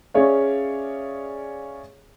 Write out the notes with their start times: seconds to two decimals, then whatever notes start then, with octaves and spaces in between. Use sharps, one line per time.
0.14 C#4 G#4 C#5 D5 E5 F5